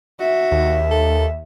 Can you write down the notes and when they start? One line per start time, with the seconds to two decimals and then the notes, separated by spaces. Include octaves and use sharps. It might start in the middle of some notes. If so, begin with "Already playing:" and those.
0.20 F#4 E5
0.51 D#2
0.91 A4